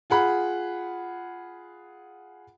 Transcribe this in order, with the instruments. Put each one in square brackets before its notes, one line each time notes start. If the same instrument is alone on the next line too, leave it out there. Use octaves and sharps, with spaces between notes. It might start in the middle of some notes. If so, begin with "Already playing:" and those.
[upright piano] F4 G#4 F#5 B5